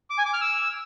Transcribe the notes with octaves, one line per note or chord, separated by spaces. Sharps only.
D6
G#5
D6
F6
E6